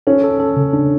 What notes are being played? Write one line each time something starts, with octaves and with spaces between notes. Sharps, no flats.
C#4 A4
A4
A4
C#3
D4